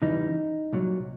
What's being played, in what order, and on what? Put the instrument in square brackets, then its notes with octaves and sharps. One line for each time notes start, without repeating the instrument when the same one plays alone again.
[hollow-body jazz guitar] E2 C#3 E3 G3 D#4
C2 A#2 F#3